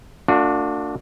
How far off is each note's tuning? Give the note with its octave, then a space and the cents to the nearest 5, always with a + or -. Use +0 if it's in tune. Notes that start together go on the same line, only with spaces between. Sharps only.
A3 +45 D4 +0 F#4 -40